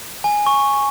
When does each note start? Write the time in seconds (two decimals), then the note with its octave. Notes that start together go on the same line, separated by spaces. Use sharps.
0.24 G#5
0.46 C#6